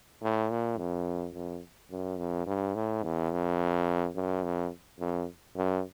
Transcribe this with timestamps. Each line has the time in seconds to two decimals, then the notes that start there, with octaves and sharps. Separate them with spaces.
0.23 A2
0.50 A#2
0.78 F2
1.35 F2
1.91 F#2
2.18 F2
2.46 G2
2.75 A2
3.03 E2
3.32 F2
4.16 F#2
4.43 F2
5.00 F2
5.56 F#2